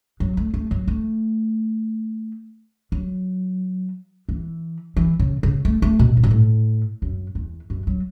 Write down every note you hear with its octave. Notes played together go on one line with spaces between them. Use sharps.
F#3
A3
A3
F#3
A3
F#3
E3
E3
C#3
C#3
A3
A3
B2
A2
B2
A2
F#2
E2
F#2
F#3